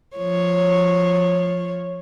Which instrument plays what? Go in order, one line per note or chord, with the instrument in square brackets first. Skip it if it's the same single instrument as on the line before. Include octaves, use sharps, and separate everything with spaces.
[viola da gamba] F3 C#5